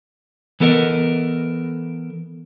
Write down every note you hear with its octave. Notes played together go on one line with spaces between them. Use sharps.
E3 B3 A4 A#4 D#5